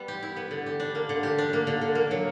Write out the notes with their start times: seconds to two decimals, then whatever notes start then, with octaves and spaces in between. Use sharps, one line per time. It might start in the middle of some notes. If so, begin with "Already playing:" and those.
Already playing: G3 B3
0.08 G4
0.23 E4
0.37 B3
0.51 D3
0.66 G4
0.80 D4
0.95 A#3
1.09 D3
1.23 G4
1.38 D4
1.53 A#3
1.67 D3
1.81 D3
1.95 A#3
2.11 F#3